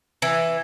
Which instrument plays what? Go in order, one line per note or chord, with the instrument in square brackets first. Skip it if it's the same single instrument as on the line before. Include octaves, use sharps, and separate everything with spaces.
[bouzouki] E3